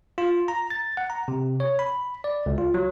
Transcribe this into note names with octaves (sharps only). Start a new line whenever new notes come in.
F4
A#5
A6
F#5
A#5
C3
C#5
B5
D5
C#2
F4
F#3